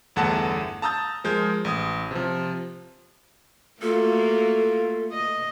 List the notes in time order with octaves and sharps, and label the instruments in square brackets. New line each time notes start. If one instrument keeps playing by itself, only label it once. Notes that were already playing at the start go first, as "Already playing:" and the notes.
[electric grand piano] G1 E2 A3 F#5 A5 A#6
A5 A#5 D#6 E6 G6 A6
F3 G#3 A#4 G6
A1 D#6
C3 F3
[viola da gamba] A3 A#3 F#4 [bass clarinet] F4 [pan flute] A4
[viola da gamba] D#5